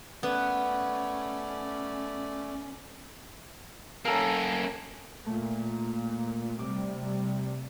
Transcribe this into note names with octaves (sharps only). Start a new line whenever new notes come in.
A3 B3 C#4 D5
A#3 C#4 A4 A#4
A#2 A3
C3 G3 D6